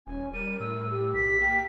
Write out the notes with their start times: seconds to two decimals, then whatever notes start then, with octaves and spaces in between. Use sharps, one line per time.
0.07 D#1 C#4 G#5
0.33 G3 A#4 D#7
0.60 A2 E6
0.90 G4
1.14 B1 B6
1.41 A#3 G5